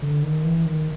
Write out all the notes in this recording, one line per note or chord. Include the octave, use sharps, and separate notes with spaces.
D3
D#3
E3
D#3